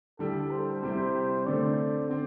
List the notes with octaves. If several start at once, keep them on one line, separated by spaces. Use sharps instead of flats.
D3 G3 E4 G4 A4
C5
C3 G3 C4 E4 G4
D3 A3 C4 A4 D5
D3 C4